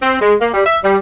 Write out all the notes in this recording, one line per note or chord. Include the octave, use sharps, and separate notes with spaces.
C4
G#3
A#3
G3
E5
G3